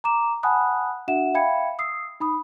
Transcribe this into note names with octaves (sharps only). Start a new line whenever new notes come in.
A#5 D6 E7
F#5 G#5 A5 B5 D#6 F#6
D4 F#4 E5 F#5 E7
E5 F5 G5 B5 G#6 C#7
D#6 E6 C7
D#4 B5 D#6